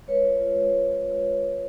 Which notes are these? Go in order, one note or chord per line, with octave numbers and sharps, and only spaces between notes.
G#3 B4 C#5
F4
F4
G#3
G#3